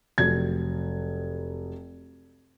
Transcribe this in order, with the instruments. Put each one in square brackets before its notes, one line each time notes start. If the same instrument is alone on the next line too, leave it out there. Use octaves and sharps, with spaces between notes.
[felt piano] F1 F#3 G#6